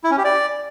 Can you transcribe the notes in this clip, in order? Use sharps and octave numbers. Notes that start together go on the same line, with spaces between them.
E4
C#4
G4
D5